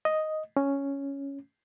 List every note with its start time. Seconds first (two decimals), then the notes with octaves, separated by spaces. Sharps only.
0.05 D#5
0.57 C#4